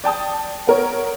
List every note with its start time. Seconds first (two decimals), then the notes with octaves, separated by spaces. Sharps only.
0.04 D5 G5 A5 D#6
0.67 B3 A#4 C#5